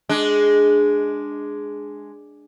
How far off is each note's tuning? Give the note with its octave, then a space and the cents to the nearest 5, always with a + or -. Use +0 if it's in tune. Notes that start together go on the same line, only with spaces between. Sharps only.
G#3 +0 D4 +0